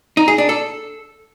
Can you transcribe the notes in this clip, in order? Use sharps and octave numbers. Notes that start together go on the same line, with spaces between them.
D#4
G#4
D4
A4